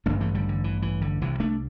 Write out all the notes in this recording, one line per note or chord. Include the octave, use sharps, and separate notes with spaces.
A1 G2 D3 A3 D4
E3 A3
D3 G3
D3
E3
E3
D3
C2 C3 E3
A3 D4